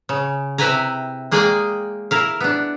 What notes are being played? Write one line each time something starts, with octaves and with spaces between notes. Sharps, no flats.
C#3
C3 E4 B4 G5 G#5 A#5
G#3 A#3 G#4 D5 G5 G#5
E4 A#4 F5
B3 D4